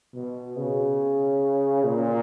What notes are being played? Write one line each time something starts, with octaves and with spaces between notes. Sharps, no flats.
B2
C#3
A#2